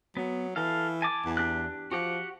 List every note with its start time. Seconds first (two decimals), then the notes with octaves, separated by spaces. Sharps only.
0.17 F#3 B3
0.56 E3 A4 F5
1.02 G#5 A5 D6
1.25 E2
1.37 D4 G4 F#6
1.92 F3 F#4 G4 F#5